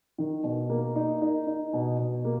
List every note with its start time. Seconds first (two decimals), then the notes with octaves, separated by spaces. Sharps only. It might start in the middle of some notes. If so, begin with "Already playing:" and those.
0.18 D#3
0.44 B2
0.69 A#3
0.96 D#4
1.22 D#4
1.47 D#4
1.73 B2
1.99 B2
2.25 A#3